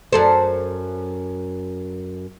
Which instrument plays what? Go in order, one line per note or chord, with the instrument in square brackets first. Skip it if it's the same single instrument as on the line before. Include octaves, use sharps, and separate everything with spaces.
[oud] F#2 A4 C5